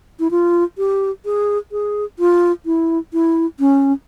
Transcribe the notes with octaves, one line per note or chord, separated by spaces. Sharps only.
E4
F4
G4
G#4
G#4
F4
E4
E4
C#4